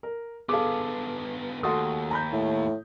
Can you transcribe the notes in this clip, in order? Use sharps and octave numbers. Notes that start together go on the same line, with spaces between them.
A#4
D3 B3 G#4 A4 F5 D6
D#2 A3 F#4 C6 D#6
A#5 B5 G6
A2